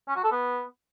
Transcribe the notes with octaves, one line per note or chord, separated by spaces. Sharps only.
C#4
F#4
A4
B3